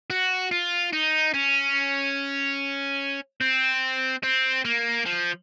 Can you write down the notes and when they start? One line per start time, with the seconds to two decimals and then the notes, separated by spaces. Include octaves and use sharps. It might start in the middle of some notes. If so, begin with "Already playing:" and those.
0.10 F#4
0.51 F4
0.93 D#4
1.34 C#4
3.41 C4
4.23 C4
4.65 A#3
5.06 F3